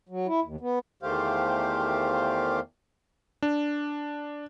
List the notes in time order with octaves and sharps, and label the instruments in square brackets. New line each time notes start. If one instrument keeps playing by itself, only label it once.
[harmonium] F#3
E4
D#2
B3
E2 D#3 A3 G4 C5 F5
[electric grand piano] D4